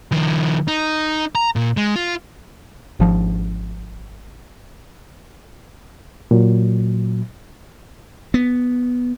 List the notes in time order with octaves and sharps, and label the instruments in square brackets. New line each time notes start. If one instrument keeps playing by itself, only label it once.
[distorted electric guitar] D#3 F3
D#4
A#5
A#2
G#3
F4
[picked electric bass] G#1 F3
[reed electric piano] A#2 F#3
[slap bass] B3